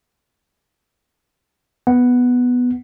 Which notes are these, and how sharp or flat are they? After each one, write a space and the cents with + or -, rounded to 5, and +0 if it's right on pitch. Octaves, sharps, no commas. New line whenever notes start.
B3 +0 F#5 +0